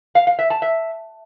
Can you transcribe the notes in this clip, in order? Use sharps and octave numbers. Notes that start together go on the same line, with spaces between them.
F5
F5
E5
A5
E5